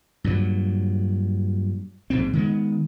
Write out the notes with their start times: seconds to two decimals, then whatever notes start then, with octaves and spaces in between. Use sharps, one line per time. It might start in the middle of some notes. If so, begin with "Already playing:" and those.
0.24 G2 A#2 F#3
2.10 A#1 G#2 C4
2.33 D#3 G#3 B3